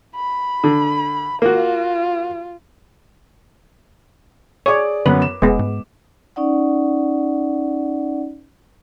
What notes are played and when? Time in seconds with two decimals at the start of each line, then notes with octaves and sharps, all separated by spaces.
0.16 B5
0.64 D3
1.42 A#3 F4 F#4
4.66 G#4 C#5 D5 D6
5.06 F#2 D3 B3 B4
5.22 E7
5.42 F1 G#3 B3
5.59 G#2
6.36 C#4 D#4 D5 F#5